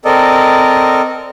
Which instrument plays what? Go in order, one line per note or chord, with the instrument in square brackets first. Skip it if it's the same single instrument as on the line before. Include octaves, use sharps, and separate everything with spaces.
[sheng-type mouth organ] C4 A4 A#4 D5 D#5